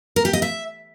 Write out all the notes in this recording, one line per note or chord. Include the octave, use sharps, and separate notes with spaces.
A#4
G4
D#5
E5